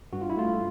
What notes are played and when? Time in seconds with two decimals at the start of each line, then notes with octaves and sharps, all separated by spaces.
0.13 G2 F#4
0.21 F4
0.30 E4
0.37 A3 F4